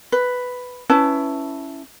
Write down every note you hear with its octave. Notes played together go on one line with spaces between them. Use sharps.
B4
C#4 E4 B4 A5